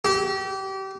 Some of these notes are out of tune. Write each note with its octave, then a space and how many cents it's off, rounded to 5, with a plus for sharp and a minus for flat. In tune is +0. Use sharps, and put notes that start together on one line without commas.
G4 -30